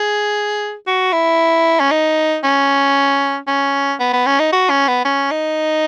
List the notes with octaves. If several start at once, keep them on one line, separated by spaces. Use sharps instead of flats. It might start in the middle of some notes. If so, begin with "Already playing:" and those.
Already playing: G#4
F#4
E4
C#4
D#4
C#4
C#4
B3
B3
C#4
D#4
F#4
C#4
B3
C#4
D#4